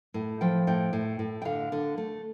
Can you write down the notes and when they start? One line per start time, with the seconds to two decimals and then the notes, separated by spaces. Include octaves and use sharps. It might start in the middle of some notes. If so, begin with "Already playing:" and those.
0.14 A2
0.41 F3 G5
0.67 A2 G5
0.93 A2
1.19 A2
1.42 G5
1.45 D3 F5
1.72 D3
1.97 A3